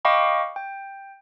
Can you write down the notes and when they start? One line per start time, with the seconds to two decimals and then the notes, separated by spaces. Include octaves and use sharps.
0.05 D#5 F5 G5 B5 C#6 D6
0.56 G5